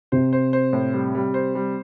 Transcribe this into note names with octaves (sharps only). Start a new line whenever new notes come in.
C3 C5
C5
C5
A2
G3
G3
C5
G3